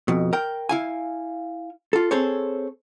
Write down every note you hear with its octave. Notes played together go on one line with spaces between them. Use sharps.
F2 B2
A#4 G5
E4 F5 G#5
F4 A4
C4 G#4 A4 C5 C#5